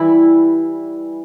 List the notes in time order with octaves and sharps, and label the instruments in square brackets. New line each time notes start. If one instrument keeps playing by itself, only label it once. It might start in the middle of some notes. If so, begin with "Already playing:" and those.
Already playing: [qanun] E3 G3 E4